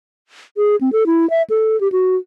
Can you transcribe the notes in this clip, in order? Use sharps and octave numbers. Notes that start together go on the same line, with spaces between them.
G#4
C4
A4
E4
E5
A4
G4
F#4